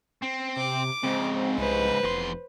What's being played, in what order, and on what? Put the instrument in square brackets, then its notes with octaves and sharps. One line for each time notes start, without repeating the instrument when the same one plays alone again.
[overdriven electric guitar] C4
[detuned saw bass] C3 [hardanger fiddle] D6
[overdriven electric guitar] G#2 C#3 [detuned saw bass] C4
[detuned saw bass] C2 [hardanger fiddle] B4 C5
[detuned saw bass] F1 [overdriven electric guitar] E2 C6